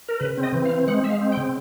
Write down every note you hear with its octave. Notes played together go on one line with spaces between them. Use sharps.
A#4
C#3 B4
C4
D#5
E3
F5
C4
G#3 F#5
G#3 E5
F5
C4
G5
C#3